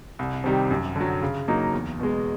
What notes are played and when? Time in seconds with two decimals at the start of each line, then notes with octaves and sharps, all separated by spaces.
0.19 C2
0.44 C3 D#3 G3
0.71 F#2
0.96 D3 F#3
1.22 C#3
1.48 F#3 A#3 D#4
1.73 E2
2.00 B2 G#3